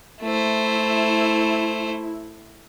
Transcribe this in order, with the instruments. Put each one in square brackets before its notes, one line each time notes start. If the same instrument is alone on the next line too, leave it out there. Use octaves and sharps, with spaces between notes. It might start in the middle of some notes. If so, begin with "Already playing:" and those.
[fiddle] A3 C5 [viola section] E4